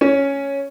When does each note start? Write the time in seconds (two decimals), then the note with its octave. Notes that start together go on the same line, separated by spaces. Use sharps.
0.01 C#4